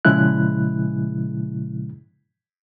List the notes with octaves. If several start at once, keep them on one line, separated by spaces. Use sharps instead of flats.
A#2 C#3 F3 G#3 E4 F#6